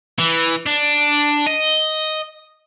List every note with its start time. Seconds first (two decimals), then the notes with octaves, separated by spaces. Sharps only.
0.19 E3
0.66 D4
1.47 D#5